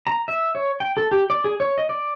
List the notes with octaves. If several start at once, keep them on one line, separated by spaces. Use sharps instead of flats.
A#5
E5
C#5
G5
A4
G4
D5
G#4
C#5
D#5
D5